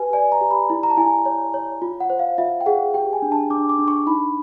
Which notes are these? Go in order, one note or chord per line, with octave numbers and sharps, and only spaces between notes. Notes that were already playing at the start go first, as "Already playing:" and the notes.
Already playing: G4 B4 G#5
D5 G#5
A#5
G4
B5
E4
A#5
A5
E4 G#5
C#5
C#5
F4
F#5
C5
F5
F4 E5
G5
G#4 F#5
G4 G5
G#5
D4
A5
D4 D6
D6
D4
C#6
D#4 B5